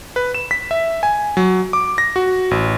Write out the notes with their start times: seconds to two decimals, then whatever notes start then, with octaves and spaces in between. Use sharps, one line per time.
0.16 B4
0.34 E7
0.51 B6
0.71 E5
1.03 G#5
1.37 F#3
1.73 D6
1.98 A#6
2.16 F#4
2.51 A1